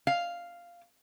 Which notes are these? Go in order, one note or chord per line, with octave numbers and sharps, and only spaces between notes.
F5